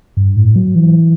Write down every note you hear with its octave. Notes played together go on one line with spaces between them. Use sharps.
G2
A2
F#3
E3